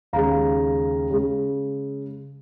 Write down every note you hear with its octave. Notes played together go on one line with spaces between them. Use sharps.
D#2 C#3 G#3 F5 A#5
C#3 G#3